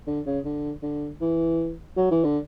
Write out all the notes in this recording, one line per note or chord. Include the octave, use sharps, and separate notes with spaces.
D3
C#3
D3
D3
E3
F#3
E3
D3